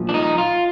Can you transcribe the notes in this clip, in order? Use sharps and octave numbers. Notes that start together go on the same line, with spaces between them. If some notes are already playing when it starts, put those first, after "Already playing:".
Already playing: A#2 F3
D4
D#4
F4